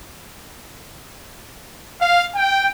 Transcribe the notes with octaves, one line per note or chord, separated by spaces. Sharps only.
F5
G5